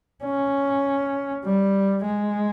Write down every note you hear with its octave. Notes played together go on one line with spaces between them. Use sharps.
C#4
G3
G#3